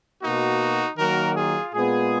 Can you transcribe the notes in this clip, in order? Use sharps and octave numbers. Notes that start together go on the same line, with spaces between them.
B2 A#3 D#4 F#4
D#3 F#3 A#3 F#4 A#4
F4 G#4
A#2 G#3 B3 F4 G#4